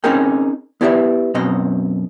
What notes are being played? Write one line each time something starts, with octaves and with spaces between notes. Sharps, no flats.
C4 C#4 D#4 G#4 A#4 G5
B3 E4 G4 B4 D5 E5
F#2 B2 C4 D#5